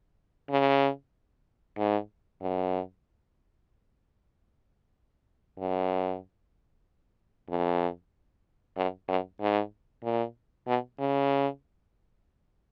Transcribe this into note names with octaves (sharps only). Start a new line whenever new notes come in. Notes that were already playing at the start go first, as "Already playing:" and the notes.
C#3
G#2
F#2
F#2
F2
F#2
F#2
G#2
A#2
B2
C#3